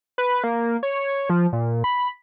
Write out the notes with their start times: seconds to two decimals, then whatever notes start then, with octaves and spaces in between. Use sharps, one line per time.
0.18 B4
0.44 A#3
0.83 C#5
1.30 F3
1.53 A#2
1.84 B5